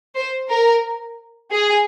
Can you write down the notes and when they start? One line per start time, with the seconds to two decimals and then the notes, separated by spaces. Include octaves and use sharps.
0.15 C5
0.49 A#4
1.52 G#4